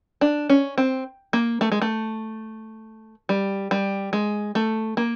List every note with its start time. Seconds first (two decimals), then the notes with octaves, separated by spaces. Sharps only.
0.21 D4
0.50 C#4
0.78 C4
1.33 A#3
1.61 A3
1.72 G#3
1.82 A3
3.29 G3
3.71 G3
4.13 G#3
4.55 A3
4.97 A#3